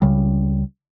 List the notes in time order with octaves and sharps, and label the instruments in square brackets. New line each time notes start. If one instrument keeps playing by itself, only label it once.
[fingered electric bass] C#2 C#3 G3